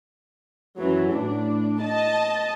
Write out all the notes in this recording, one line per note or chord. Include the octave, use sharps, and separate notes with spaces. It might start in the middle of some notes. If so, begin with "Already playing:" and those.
F#2 E3 F#3
A2 D4
D#5 A5